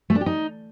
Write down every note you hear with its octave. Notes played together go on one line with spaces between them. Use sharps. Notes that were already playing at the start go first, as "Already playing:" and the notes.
A3
D4
G4
D#4